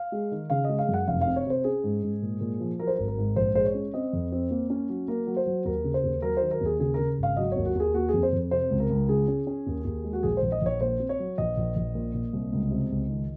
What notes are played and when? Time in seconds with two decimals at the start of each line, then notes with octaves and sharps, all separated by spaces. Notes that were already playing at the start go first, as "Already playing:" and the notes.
Already playing: F5
0.12 G#3
0.32 D#3
0.50 C#3 F5
0.64 G#3 D#5
0.79 F5
0.88 F#2
0.94 F#5
1.08 F1 F5
1.21 F5
1.27 C3
1.36 C#5
1.46 C3 C5
1.64 C#4 G#4
1.84 G#2
2.03 G#2
2.22 A#2
2.41 A#2
2.60 F3
2.79 F#3 A#4
2.87 C5
2.95 G#1 A#4
3.08 A#4
3.18 G#2
3.36 A#1 C5
3.55 G#3 C5
3.65 C#5
3.74 C#4
3.94 C4 D#5
4.13 F2
4.32 C4
4.51 A#3
4.70 C#4
4.89 F#3
5.08 A#3 A#4
5.27 F#3
5.37 C5
5.46 F#3
5.65 D#2 A#4
5.84 C#3
5.94 C5
6.03 D#2
6.22 F#3 A#4
6.37 D#3 C5
6.51 A#4
6.61 D#2 G#4
6.80 C#3 G#4
6.94 C#3 A#4
7.18 G#1 F5
7.37 F#3 D#5
7.52 D#2 C#5
7.65 F#4
7.75 D#2 G#4
7.94 A#3 F#4
8.09 F2 G#4
8.23 C5
8.32 F2
8.51 C3 C5
8.70 C#2
8.80 A#4
8.90 C#2
9.08 C#3 G#4
9.28 C#4
9.47 C#4
9.66 D#2
9.85 D#2
10.04 G#3
10.13 F#4
10.23 A#1 G#4
10.37 C5
10.42 A#1
10.52 D#5
10.61 A#1 C#5
10.81 A#2 C5
11.00 C4
11.09 C#5
11.19 F#3
11.38 A#1 D#5
11.57 A#1
11.76 A#1
11.95 A#2
12.14 A#2
12.33 C2
12.52 C#2
12.71 C3
12.90 C#2
13.10 D#3